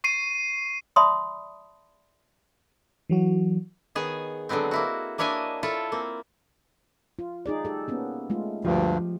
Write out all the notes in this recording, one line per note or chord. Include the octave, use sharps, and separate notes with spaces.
C#6 C7 D#7
D5 E5 A5 B5 C6 D#6
E3 F#3 F#4
D#3 B3 G#4 C#5 G#5
D3 F#3 G#3 B3 C4
A#3 E4 F#4
A#3 D4 E4 C#5 D#5 G#5
E4 F4 A4 C#5
A#3 C4
F4
D#4 G#4 D5
G4 A4
A#3 B3 C#4
G#3 A3 F4
D2 G2 F3 G4